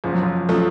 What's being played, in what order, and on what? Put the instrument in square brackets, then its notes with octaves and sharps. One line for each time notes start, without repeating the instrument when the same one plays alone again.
[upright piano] F#1 [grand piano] F3
[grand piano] F#3
F3
[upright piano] C#3 F3 A3 [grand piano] F#3